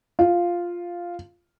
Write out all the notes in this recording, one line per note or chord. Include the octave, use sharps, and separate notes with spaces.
F4